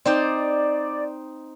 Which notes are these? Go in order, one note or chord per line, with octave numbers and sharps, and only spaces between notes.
C4 D#4 C5 D5